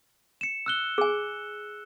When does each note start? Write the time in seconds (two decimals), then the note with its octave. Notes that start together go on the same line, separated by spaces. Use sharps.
0.41 C#7 E7
0.66 E6 F#6 G7
0.98 G#4 G#5